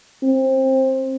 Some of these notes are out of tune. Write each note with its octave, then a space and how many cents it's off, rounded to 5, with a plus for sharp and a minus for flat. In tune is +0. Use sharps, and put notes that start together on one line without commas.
C4 +20